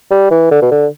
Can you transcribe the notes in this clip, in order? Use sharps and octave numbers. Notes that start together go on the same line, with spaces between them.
G3
E3
D3
B2
D3